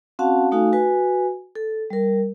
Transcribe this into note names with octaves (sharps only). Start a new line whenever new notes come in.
C4 C#4 F#4 F5 F#5 A5
A3 D#4 F#4 A4 F5 G#5
F#4 B4 G#5
A4
G3 A#4